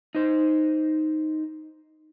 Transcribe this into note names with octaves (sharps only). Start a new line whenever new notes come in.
D#4 C5